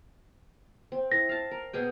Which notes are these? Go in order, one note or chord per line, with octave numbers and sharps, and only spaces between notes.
C4
E4 A#6
F5 A5
A#4
B2 G#4 G5